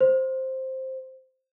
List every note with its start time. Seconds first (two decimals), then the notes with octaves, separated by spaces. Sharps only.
0.01 C5